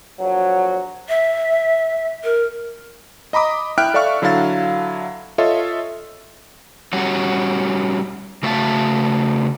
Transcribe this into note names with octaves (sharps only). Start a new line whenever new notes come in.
A#1 F#3
E5
A#4
D#5 A#5 B5 D6 D#6
E4 E5 G5 F6 F#6 D7
A4 D5 E5 F5 C#6 F6
D3 F#3 E4 A4 F5 A6
F4 A4 C#5 D#5 E5
G3 C#4 F#4
C#3 A3 F#4 E5 F5 A5